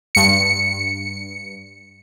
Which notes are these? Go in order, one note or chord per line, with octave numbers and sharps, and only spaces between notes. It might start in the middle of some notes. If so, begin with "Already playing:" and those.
G2 C#7